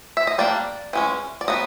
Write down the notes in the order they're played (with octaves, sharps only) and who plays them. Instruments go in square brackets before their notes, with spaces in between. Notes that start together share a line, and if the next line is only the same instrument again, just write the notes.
[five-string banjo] E5
D#5
G3 A#3 D4 D5
E3 G#3 C#4
D5
F#3 B3 D#5